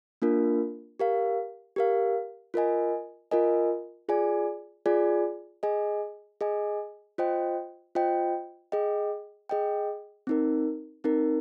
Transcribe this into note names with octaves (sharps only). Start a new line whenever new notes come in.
A#3 D4 F4 A#4
G4 A#4 F5
G4 A#4 F5
F4 A#4 D#5 G#5
F4 A#4 D#5 G#5
F4 G#4 D5 G#5
F4 G#4 D5 G#5
G#4 D#5 G#5
G#4 D#5 G#5
F4 C5 D#5 G5
F4 C5 D#5 G5
G#4 D#5 G5
G#4 D#5 G5
C4 D#4 A#4
C4 D#4 A#4